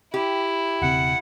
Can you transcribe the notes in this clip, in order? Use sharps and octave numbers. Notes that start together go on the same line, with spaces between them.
E4 G4
E1 C#3 C4 F#5